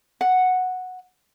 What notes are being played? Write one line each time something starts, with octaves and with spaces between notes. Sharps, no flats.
F#5